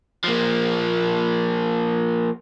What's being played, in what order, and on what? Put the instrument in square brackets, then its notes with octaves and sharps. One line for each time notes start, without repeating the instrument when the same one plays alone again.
[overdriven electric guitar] F3 A#3